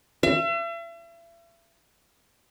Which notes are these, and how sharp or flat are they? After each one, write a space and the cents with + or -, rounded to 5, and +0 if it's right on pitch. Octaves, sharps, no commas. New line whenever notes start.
E5 +40